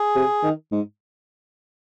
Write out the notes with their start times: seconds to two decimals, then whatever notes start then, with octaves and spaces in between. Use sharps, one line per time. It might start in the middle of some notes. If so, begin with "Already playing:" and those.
Already playing: G#4
0.16 C3
0.43 D#3
0.72 G#2